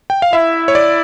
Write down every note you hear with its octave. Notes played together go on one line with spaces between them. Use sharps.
G5
F5
E4 E5
C#5
D5